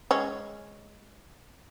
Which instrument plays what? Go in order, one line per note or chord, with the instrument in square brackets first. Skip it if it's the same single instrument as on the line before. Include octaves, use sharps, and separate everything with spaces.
[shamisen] G#3 C#4